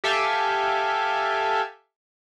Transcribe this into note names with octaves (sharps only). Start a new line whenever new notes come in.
G4 A4 E5 F5 G5 G#5